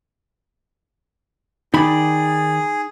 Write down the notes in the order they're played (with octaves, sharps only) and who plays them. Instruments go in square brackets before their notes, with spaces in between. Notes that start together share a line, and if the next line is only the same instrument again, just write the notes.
[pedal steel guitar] D#3 D5 [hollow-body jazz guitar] D#4 B5 [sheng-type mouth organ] G#4